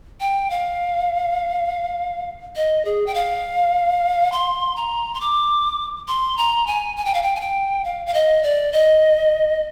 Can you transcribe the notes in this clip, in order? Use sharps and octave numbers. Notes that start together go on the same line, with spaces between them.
G5
F5
D#5
G#4
G5
F5
C6
A#5
C6
D6
C6
A#5
G#5
G#5
G5
F5
G5
G#5
G5
F5
F5
D#5
D5
D#5